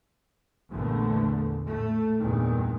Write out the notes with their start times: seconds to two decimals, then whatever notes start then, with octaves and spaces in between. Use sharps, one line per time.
0.71 A#1 E2 D3 A3
1.65 A2 A3
2.19 E2 G2 A#2 D#3